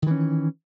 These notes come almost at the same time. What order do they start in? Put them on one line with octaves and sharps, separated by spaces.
D#3 E3 C#4